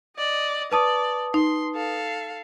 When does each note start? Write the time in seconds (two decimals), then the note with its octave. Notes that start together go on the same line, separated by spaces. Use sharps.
0.17 D5 D#5
0.72 B4 D5 A5 D#6
1.34 D#4 C6
1.75 A4 F5